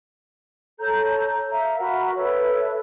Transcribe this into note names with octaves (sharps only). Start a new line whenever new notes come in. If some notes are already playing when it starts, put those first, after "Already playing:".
A4 C#5 A#5 G6
E5 F5 A#5
F#4 A#4 F#5 B5
A4 B4 C#5 E5